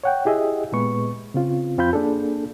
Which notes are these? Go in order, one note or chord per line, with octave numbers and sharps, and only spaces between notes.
C#5 F#5 G5
E4 G4 G#4 D#5 E5
A#2 G#3 B3 B4 C#6
C#3 C4 F4
F2 C4 F4 B5 G6
A#3 D4 G#4 A4